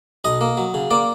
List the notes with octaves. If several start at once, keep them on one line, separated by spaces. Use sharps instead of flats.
B1 D#5
A#3
F#3
C#3
A#3 D5